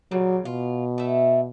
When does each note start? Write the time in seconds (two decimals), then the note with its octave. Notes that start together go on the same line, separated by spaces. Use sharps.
0.11 A#2 C#3 F#3 G3
0.45 B2 F4
0.98 A3 E5